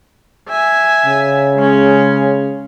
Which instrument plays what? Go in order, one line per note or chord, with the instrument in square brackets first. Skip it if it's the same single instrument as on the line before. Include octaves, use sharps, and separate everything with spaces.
[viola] E5 G#5
[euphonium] C#3
[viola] G#3 C#4